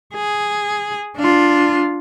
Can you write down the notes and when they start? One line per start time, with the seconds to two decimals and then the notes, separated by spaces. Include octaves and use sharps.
0.14 G#4
1.16 D4 F4